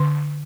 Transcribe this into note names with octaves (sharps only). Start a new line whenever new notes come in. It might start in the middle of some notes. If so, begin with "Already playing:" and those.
Already playing: D3